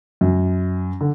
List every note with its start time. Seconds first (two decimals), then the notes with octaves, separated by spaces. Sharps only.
0.21 F#2
1.01 D3